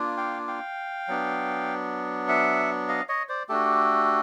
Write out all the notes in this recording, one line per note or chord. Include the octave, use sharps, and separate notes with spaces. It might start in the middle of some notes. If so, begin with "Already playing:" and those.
Already playing: A#3 D4 F4
F5 G5
F5 G5
F#3 B3 D4
E5 F#5
D#5 F5
C#5 D#5
C5 D5
A3 D4 F#4 G4 A4